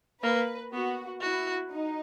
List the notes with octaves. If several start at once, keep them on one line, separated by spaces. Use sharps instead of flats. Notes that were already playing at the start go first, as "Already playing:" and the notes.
A#3 B4
B3 F#4
E4 F#4
D#4